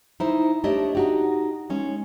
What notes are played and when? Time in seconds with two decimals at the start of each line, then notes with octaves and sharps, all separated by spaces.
0.20 D#4 E4 C5
0.64 A3 D4 G4 C#5 D#5
0.95 D#4 F#4 G4
1.70 G#3 C#4 D#4